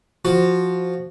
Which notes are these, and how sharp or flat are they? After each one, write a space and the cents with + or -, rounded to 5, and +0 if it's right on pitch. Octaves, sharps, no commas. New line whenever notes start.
F3 +0 F#4 +0